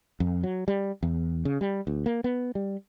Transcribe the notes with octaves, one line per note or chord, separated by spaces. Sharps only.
F2
F#3
G3
E2
C#3
G3
D2
A#3
B3
G3